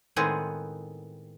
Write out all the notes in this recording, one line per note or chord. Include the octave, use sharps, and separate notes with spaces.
A2 D#3 G#3 B3 C4 G#4